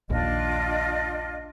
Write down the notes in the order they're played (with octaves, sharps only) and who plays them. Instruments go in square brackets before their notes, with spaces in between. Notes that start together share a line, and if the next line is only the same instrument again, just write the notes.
[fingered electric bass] A#1 D#2 A#2 [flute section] D4 F4 D#5